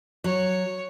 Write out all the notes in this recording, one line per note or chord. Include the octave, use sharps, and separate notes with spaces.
F#3 C#5